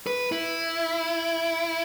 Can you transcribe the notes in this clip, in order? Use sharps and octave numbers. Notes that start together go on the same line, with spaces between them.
B4
E4